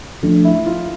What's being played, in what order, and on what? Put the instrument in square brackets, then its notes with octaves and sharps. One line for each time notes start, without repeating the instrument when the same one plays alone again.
[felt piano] F3 A3 D4
[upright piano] E4
F4